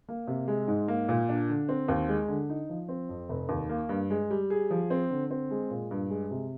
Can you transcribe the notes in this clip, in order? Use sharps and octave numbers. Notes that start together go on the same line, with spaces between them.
A#3
C3
G#3
G#2
A#3
A#2
D4
D3
C4
D#2
G#3
D3
D#4
F3
C4
F2
F1
D#2
A#3
G2
G#3
G3
G#4
F3
C4
D3
C4
G#3
A#2
G2
G#3
C3